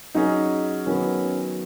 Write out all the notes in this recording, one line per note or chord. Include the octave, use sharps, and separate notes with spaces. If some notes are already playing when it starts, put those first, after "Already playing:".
F#3 C#4 D#4 G#4
D#3 F#3 B3 C#4